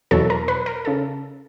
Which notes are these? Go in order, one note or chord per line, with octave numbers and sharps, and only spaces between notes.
E2 B2 F#3 A4
A#4
B4
A#4
A4
C#3